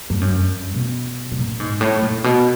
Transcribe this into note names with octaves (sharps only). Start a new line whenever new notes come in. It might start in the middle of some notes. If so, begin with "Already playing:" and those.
G2
F#2
G2
B2
B2
A#2
G#2
A2
A#2
B2